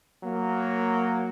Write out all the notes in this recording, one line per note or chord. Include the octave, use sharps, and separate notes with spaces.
F#3 A#3